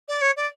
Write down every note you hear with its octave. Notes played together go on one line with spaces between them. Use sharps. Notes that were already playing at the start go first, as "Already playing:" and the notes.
D5
C#5
D5